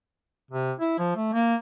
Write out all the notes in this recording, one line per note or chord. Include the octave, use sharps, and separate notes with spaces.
C3
E4
F3
A3
A#3